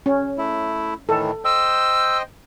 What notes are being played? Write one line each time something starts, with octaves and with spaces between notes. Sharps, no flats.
C#4
A3 E4
A2 D#3 E3 A4
C5 D#5 G5 E6